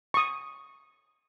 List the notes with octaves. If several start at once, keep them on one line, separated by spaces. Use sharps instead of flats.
C#6 D#6